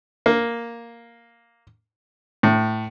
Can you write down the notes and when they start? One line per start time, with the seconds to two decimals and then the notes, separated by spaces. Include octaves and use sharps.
0.26 A#3
2.43 A2